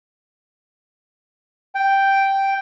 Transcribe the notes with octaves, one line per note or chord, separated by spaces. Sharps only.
G5